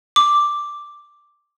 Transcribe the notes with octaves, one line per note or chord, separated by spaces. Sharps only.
D6